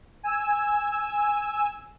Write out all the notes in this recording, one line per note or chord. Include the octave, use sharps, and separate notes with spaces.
G#5 E6